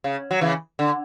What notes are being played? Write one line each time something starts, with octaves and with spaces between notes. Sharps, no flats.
C#3
F#3
C#3 E3
D3